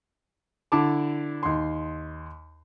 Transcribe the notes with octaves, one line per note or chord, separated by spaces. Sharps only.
D3 E4 A5 D6
D#2 C6